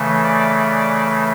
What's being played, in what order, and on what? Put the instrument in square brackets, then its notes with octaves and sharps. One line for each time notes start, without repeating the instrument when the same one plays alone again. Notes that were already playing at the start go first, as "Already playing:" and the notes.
Already playing: [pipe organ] C#3 E3 A3
D5
D5